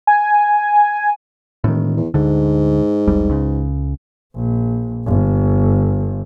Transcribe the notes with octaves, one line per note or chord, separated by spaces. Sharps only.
G#5
E1 A2 D#3
E2
D2 G#2 D3
F1 C2 G3
C#2 C#3
A#1
G1